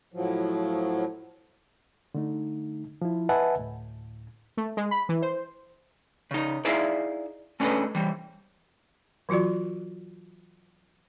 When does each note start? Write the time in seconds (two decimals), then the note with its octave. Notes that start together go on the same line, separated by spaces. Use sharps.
0.14 A2 F3 F#3
2.14 D3 A3 D#4
3.02 F3 E4
3.29 B4 D#5 E5 F#5 G#5 A5
3.56 D2 A2
4.57 A3
4.77 G#3
4.91 B5
5.09 E3
5.22 C5
6.31 C#3 D#4
6.65 D#4 E4 G#4 D5 E5 F5
7.60 A3 C#4 D4 A4 B4 D#5
7.95 E3 G3
9.29 E3 F#3 F4 F#4 D5